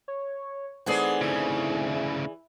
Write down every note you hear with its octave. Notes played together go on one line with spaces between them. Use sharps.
C#5
E3 A3 C4 D#4 G#4 D5 F#5
D2 C#3 E4